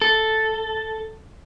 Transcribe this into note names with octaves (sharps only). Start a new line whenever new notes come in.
A4